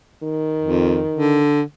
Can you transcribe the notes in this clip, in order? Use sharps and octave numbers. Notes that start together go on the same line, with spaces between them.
D#3
F2
D3